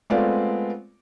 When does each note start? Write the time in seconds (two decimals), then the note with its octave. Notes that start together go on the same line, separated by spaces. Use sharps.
0.10 G#3 A3 B3 C4 F4 D5